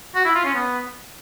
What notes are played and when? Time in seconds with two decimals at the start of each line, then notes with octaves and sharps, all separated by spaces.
0.15 F#4
0.25 E4
0.35 F4
0.45 C#4
0.55 B3